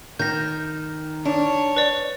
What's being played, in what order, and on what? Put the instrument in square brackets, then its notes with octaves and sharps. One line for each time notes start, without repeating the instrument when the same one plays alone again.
[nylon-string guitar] D#3 [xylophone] G6 A#6
[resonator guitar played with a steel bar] D4 [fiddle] C#5
[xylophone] B4 D5